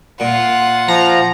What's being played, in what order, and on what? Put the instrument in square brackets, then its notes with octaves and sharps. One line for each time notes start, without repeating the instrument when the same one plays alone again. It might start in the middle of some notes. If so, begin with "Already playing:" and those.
[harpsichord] A#2 [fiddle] F4 F#5
[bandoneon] F3 [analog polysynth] A#5